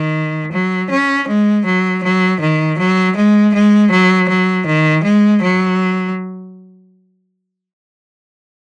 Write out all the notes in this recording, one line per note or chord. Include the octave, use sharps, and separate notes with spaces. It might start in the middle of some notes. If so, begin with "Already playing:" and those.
Already playing: D#3
F#3
C#4
G#3
F#3
F#3
D#3
F#3
G#3
G#3
F#3
F#3
D#3
G#3
F#3